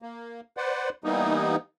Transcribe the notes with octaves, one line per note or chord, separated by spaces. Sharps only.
A#3
B4 C5 D5 F#5
E3 G3 A#3 B3 D#4